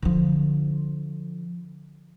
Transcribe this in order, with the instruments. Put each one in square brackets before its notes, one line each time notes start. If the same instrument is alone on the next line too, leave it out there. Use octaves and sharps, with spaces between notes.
[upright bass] D3 F3